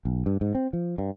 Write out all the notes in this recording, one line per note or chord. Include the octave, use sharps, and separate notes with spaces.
B1
G2
G#2
C4
F3
G2